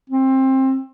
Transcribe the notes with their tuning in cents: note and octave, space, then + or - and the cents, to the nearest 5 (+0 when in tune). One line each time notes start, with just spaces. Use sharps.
C4 +20